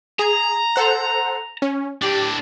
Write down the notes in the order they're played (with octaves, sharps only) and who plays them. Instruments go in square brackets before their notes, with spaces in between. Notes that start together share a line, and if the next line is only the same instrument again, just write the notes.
[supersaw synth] G#4 [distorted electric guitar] A#5
[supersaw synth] A4 C5 F#5
C#4
[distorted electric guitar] A2 D4 [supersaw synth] G4